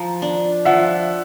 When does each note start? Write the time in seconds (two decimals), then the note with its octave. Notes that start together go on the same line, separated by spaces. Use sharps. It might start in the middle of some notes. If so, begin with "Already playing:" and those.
Already playing: F3 A#5
0.22 D4
0.65 F3 E5 F#5